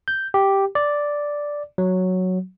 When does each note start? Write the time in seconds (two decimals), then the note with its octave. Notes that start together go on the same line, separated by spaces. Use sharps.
0.08 G6
0.34 G4
0.75 D5
1.78 F#3